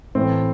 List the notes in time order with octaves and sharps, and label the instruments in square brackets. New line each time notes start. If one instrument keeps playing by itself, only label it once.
[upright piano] A2 E3 A3 [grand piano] C4